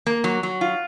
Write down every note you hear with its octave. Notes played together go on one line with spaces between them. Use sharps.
A#3
F#3
F#3
F4